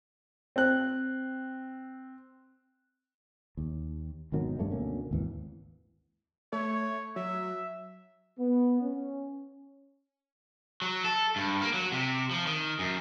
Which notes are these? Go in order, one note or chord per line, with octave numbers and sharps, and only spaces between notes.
C4 F#6
D#2
G#1 B2 D#3 F#3
G2 G3 A3 C#4
D2 B2 A#3 C#4
G#1 D#2 E3
A3 C#5
F#3 E5
B3
C#4
F#3
A4
G2
A#3
F#3
C3
F3
D#3
F#2